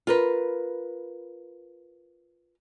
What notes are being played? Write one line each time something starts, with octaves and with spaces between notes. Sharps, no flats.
F4 A#4 B4